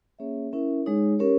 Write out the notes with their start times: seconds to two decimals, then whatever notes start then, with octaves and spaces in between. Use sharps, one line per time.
0.19 A#3 C#4 G#4 C#5 E5
0.52 C#4 E4 A#4 E5
0.86 G#3 D#4 G#4 C#5
1.19 C#4 G4 A#4 C#5